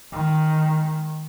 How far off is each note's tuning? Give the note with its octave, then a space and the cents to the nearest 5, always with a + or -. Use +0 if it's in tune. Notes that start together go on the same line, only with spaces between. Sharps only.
D#3 +0 G#3 +0